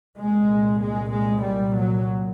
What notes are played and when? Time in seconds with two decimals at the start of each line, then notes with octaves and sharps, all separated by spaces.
0.19 C2 A#2 G#3
0.82 G#3
1.13 G#3
1.44 G3
1.77 F#3